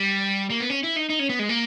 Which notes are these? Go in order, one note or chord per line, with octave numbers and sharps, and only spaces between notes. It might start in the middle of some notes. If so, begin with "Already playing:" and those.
Already playing: G3
A#3
B3
C#4
E4
D#4
D#4
C#4
B3
G#3
A#3